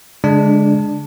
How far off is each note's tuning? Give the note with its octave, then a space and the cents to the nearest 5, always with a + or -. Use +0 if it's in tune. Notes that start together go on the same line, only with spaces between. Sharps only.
D3 -30 G#3 +0 D4 +5